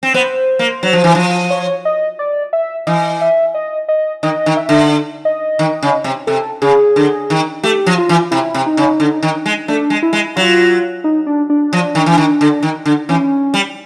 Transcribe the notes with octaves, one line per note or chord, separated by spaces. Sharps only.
C4
B3 C5
A#3
F#3
F3
E3
F3
C#5
D#5
D5
E5
E3 D#5
E5
D#5
D#5
D#3 D#5
D#3
E5
D3
D#5
D#3
C#3
C3
C3 A4
C#3 G#4
D3
D#3
A3 G4
F3
F4
E3
C3 E4
C3
D#4
C#3
D3
D#3
G#3
A3 D4
G#3
E4
G#3
F#3 F4
D#4
D4
D4
F3
D#3
E3
D#3
D3
D#3
D3
E3 C#4
G3